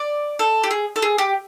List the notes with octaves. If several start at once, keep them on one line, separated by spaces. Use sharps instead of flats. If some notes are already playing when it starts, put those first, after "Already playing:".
Already playing: D5
A4
G4
G#4
A4
G#4
G4